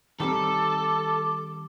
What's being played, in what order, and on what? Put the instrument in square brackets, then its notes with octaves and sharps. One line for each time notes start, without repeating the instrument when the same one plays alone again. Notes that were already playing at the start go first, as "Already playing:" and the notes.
[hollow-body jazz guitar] D#3 G3 C4 [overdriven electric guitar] A4 [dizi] D6